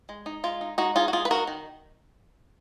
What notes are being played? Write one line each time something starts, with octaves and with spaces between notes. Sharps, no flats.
G#3
D#4
G#3 F4
D#4
G#3 D#4 F#4
D#4 F4 G#4
F#4
G#3 F4 G#4
B4
D#4 F#4 A#4
D#3